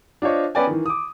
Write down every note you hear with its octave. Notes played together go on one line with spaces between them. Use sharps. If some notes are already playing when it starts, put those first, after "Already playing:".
D4 F4 C5 C#5 D#5
B3 C#4 B4 D5 G5 G#5
D#3 E3
D6 D#6